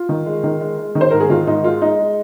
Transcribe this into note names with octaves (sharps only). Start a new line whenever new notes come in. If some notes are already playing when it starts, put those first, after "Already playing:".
Already playing: F4
D#3
G#3
D#3
G#3
G#3
D#3
C5
G#2 A#4
G#4
D#3 F4
G#2 D#4
G#3 F4
G#3 D#4
G#3